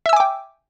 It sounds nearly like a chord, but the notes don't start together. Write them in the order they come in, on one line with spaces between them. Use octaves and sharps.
E5 E6 G#5 D6 G5